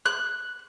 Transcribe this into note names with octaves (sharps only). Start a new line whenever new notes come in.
F#6